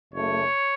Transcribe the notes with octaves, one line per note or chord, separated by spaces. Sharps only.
F#1 F#2 C#3 A3 C#5